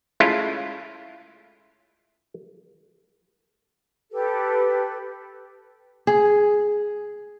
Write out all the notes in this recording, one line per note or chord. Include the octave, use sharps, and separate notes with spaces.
G#3 A3 C#4 E4 F4
G4 A4 B4
G#4